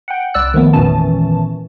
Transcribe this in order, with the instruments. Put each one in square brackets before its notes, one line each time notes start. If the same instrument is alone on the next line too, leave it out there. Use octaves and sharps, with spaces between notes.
[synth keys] F#5 G5
C2 D5 E6 F#6
D#3 F3 A3 B3
G#1 E2 A#2 E3 C#4 A5